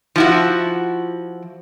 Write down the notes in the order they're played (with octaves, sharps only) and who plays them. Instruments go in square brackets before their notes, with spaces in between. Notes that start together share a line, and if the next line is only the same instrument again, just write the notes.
[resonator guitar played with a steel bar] F3 E4 F#4